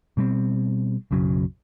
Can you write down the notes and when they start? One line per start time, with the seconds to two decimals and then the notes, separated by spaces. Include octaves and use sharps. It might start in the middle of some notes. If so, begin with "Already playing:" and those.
0.17 B2 G3 A#3 C4
1.11 B1 F#2 C#3 F#3